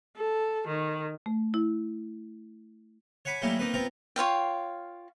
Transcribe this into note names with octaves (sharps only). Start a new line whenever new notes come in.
A4
D#3
A3
E4
C#5 F#5 G#5 B5 D6
F#3 G3 A3 A#3 C#4 E4
D#3 A#3 C4 D#4 B4
B3 C4 F4 A#4 A#5
F4 C#5 F5 G5